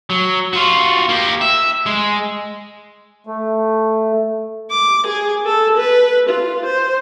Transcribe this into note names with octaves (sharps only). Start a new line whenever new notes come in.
F#3
F4 F#4
A#3 G4
E5
G#3
A3
D6
G#4
A4
B4
F4
C5